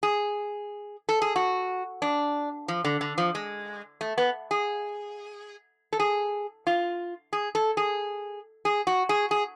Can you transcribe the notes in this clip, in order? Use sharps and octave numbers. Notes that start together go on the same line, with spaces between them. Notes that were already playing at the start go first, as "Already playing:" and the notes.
G#4
A4
G#4
F#4
D4
F3
D3
D3
F3
G#3
A3
B3
G#4
A4
G#4
F4
G#4
A4
G#4
G#4
F#4
G#4
G#4